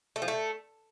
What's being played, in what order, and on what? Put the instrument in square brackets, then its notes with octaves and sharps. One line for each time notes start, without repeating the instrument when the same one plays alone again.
[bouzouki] A3
F3
A3